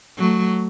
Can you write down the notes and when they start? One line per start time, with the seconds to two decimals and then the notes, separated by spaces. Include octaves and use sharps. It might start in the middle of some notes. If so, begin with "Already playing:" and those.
0.18 F#3 A3